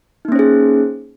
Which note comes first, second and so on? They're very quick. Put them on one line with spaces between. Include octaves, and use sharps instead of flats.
D#4 A#3 C#4 C5 G#4